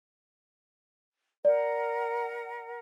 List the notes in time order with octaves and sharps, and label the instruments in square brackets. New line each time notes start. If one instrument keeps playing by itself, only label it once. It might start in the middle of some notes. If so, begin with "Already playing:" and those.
[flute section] A#4 F#5 [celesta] D5